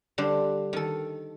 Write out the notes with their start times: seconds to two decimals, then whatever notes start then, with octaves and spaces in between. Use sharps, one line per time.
0.18 D3 G3 D4 C5
0.73 D#3 A4